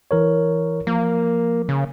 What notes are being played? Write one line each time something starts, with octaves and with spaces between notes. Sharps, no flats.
E3 A#4 C#5
F3 A#3
C#3